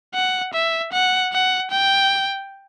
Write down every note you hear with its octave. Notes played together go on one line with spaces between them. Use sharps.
F#5
E5
F#5
F#5
G5